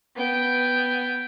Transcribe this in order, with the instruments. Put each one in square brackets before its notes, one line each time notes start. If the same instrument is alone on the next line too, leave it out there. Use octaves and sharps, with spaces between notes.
[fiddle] B3 G5